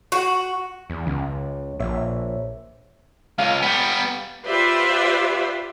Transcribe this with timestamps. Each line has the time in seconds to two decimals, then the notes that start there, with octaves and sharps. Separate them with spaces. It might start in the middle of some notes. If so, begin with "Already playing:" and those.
0.12 F#4
0.90 E2
1.07 C#2 C#3
1.80 A#1 A#2 C#5 E5
3.38 C#2 F5 D#7
3.62 G3 B3
4.47 F4 G4 B4 C5 D5 E5